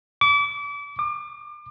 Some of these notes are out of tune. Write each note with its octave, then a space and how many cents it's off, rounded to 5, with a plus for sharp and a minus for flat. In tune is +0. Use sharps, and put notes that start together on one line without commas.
D6 -35
D6 +35